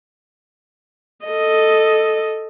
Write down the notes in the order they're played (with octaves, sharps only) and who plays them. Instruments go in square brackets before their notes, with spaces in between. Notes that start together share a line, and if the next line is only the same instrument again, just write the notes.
[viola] A4 D#5